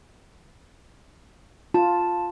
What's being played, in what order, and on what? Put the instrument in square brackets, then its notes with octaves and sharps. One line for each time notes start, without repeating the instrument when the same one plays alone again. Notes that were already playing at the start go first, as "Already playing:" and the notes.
[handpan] F4 [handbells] A5